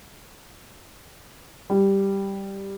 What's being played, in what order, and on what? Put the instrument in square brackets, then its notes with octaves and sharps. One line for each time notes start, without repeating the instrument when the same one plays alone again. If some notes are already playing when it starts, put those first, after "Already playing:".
[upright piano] G3